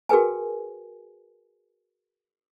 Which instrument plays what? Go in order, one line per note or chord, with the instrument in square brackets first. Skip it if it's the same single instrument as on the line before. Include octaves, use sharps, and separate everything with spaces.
[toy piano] F#4 G#4 A#4 B4 G5 G#5